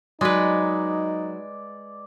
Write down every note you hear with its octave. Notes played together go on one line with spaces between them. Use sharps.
F#3 G#3 D#4 B4 D5